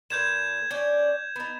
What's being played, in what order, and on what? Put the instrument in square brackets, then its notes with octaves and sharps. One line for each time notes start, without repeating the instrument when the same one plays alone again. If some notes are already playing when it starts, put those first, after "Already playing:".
[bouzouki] A#2 A4 B4 [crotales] G6 G#6 E7
[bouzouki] C#4 D4 D5 [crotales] G#6
[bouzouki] B3 D#4